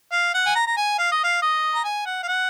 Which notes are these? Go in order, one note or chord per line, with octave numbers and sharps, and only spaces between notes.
F5
F#5
G#5
A#5
A#5
G#5
F5
D#5
F5
D#5
A#5
G#5
F#5
F5
F#5